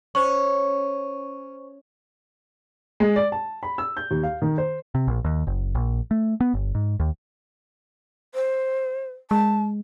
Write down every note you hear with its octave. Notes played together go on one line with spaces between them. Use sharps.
C#4 C5 C#6
G#3
D5
A5
B5
E6
G6
D#2
F5
D#3
C5
C3
A#1
D#2
F#1
A#1
A3
B3
G1
G#2
D#2
C5
G#3 A5